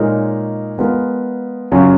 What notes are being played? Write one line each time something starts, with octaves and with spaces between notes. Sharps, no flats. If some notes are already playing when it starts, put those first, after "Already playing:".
Already playing: A#2 G#3 D#4 A#4 C#5
G#3 B3 F4 A#4
F#2 C#3 F#3 C#4 F4